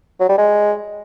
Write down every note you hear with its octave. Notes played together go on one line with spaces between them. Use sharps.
F#3
G3
G#3